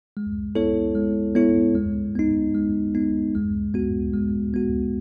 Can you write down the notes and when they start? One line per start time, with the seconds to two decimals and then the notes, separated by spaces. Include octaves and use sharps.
0.17 G#3
0.55 B3 E4 A4 C#5
0.95 G#3
1.35 B3 E4 A4 C#5
1.75 G#3
2.15 B3 D#4
2.55 G#3
2.95 B3 D#4
3.35 G#3
3.74 B3 F#4
4.13 G#3
4.54 B3 F#4